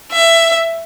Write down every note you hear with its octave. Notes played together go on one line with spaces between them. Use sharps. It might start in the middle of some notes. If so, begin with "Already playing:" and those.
E5